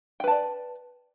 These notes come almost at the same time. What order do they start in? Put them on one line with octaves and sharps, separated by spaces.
G5 B4 A5 D5